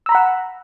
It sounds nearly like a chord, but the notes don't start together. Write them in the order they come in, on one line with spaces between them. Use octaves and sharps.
E6 A#5 B5 F#5